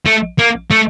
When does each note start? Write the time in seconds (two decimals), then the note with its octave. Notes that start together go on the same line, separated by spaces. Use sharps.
0.06 A3
0.39 A#3
0.71 A3